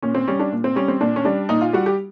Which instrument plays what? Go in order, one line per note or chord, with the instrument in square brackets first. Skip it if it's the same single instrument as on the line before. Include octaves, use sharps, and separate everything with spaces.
[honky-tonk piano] A#2 C#4
C4
G3 C#4
D4
A#2
C4
G3 C#4
C4
A#2 D4
C#4
G3 D4
A#2 D#4
F4
G3 F#4
G4